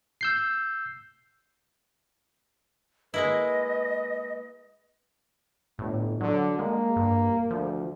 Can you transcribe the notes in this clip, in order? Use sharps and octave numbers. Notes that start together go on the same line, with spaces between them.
E6 G6 C7
G#3 A#3 E4 B4 D#5
G1 A2
D3 F#3
G#3 A#3
G2
D2 F3